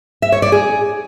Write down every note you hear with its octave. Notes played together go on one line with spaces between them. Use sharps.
E5
C#5
D5
G#4